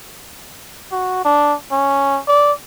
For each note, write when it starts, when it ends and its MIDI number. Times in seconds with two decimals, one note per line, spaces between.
0.92 1.24 66
1.25 1.54 62
1.71 2.20 61
2.28 2.52 74